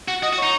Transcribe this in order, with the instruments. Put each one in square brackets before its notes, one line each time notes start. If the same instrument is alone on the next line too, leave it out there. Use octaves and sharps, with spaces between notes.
[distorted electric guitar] F#4
[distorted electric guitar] F#4 [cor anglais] D#5
[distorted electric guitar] F#4
[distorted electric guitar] D#4 [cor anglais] C#5